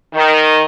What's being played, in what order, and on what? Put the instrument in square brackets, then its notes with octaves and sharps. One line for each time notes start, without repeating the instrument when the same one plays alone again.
[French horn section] D#3